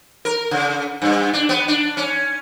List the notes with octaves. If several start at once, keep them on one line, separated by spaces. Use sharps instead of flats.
A#4
C#3
G2
D4
B3
D4
C#4